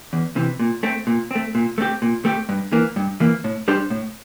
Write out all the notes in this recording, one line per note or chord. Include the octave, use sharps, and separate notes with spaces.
E2
C3 E3
A#2
A3 C4
A#2
A3 C4
A#2
A3 C4 G4
A#2
A3 C4 G4
G2
E3 A#3
G2
E3 A#3
A2
G3 D4 G4 C5
A2